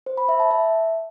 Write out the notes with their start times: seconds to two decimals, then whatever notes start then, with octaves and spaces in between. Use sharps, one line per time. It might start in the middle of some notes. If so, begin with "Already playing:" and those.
0.06 C5
0.18 B5
0.29 E5
0.40 A5
0.51 E5